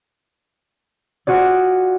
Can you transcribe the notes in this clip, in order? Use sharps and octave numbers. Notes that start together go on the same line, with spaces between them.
F4 F#4 G#4 D5